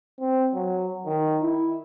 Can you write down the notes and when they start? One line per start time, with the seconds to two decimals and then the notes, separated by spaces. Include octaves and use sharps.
0.19 C4
0.54 F#3
1.06 D#3
1.42 E4